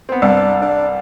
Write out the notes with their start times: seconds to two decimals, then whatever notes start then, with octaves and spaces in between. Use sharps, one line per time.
0.09 B3 C4
0.22 C2 G2 D4
0.62 D4